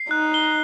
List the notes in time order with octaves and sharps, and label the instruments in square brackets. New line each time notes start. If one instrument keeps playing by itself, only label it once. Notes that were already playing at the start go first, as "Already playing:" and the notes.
Already playing: [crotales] C7
[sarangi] D#4 [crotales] F#6
[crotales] G7